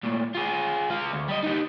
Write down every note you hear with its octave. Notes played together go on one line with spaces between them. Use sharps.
A#2 A3
F4 G#4
G#3 F5
D2
G3 D#5
D#4 G4